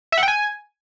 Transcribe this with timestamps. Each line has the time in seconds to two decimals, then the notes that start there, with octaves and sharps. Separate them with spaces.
0.12 E5
0.18 F#5
0.23 G5
0.28 G#5